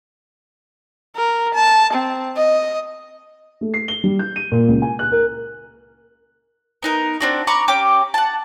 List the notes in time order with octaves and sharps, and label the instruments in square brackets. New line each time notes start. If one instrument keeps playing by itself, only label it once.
[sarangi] A#4
A5
C4
D#5
[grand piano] A3
C7
G7
G3
G6
D#7
A#2
C#2
G#5
F#6
A#4
[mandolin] B3 D#4 A#4
C4 D4 F#4
A#5 B5 C#6 D6
C#4 G4 G5 D6
F#5 A5